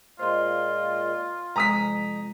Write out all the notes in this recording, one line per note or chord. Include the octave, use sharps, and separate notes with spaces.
A#2 G#3 A#3 F4 C5 D#5 C6
F2 C3 G#3 A#5 D#6 B6